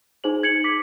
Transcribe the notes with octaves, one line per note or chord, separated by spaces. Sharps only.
D#4 G#4 C5 F#7
G#6 C#7 F#7
D6 B6